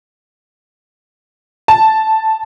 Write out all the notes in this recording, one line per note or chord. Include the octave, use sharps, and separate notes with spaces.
A5